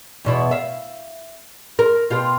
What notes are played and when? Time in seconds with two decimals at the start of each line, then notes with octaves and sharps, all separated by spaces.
0.25 E2 B2 E4
0.51 E5 F5
1.79 A#4
2.10 B2 F4 G4